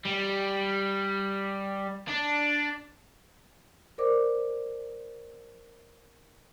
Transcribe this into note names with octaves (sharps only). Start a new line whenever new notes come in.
G3
D4
A#4 C5 D5 D6